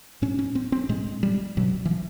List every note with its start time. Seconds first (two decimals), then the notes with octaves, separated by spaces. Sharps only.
0.22 A2 C#4
0.39 C#4
0.55 C4
0.72 C4
0.89 A2 G#3
1.23 G3
1.57 B2 F#3
1.85 E3
1.91 F3